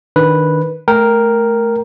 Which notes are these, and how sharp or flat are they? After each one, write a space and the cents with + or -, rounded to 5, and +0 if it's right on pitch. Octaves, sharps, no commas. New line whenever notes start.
D#3 +0 D4 +0 B4 -5
A3 -20 A#4 +0 G5 +0